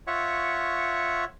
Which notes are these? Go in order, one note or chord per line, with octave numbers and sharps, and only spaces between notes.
F4 C#5 E5 F#5 C#6